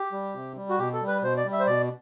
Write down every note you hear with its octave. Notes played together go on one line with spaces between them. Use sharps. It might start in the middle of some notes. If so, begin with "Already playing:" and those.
Already playing: G4
G3
C3
G3
F#4
B2 G4
A4
G3
B4
B2 C5
D5
G3
E5
C5
B2 D5